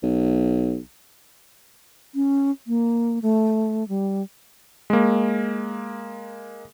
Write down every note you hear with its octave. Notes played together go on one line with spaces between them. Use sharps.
B1
C#4
A#3
A3
G3
G#3 A#3